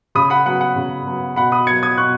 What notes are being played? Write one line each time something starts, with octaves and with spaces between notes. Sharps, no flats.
C#3 B5 D#6
F#5 B5
F#3 B3 F#5
F#5
C#3
F#3 B3
B2 F#5 B5
B5 D#6
F#3 B3 G#6 C#7
D#6 G#6
B2 C#6 F#6